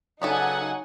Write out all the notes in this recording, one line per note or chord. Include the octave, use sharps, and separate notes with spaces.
C#3 F#3 B3 D4 D#4 A4 F#5 G#5